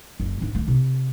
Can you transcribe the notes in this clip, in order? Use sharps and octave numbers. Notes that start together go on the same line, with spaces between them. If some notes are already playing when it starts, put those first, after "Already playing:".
F#1
G#2 D4
D#3 A3
C3